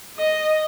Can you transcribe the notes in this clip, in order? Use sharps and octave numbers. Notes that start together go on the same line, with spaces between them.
D#5